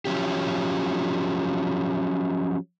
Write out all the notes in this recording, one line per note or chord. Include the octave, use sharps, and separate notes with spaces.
F3 F#3 C#4 G4